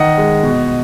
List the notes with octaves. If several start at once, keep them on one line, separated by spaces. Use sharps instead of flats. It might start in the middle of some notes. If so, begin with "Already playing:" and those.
Already playing: D#3 D#5 F#5
G#3
B2